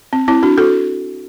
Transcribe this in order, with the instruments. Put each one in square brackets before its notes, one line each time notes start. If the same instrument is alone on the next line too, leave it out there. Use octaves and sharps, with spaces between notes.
[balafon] C4
C4 E4
D4 F#4
F#4 A4